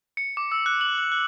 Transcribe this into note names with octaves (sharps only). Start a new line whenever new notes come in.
C#7
D6
E6
F#6
F#7
F#6
F#6